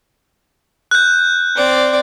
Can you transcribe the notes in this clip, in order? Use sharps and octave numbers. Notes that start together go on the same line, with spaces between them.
F#6 G6
C4 D5